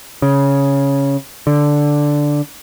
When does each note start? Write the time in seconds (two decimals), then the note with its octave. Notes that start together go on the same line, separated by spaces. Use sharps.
0.22 C#3
1.47 D3